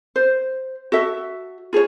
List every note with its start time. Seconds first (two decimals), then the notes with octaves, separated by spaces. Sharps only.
0.16 C5
0.92 F#4 A4 E5
1.73 F4 G#4 A4 C#5